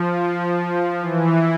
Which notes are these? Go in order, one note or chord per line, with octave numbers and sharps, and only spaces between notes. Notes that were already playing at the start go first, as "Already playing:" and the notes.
Already playing: F3
E3